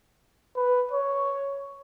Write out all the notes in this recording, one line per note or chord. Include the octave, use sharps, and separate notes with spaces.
B4
C#5